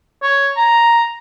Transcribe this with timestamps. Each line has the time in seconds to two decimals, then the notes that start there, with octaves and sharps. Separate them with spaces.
0.22 C#5
0.57 A#5